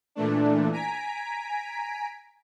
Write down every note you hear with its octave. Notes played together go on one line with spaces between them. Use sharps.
A#2 E3 A3 D4
G#5 A#5 B6 D7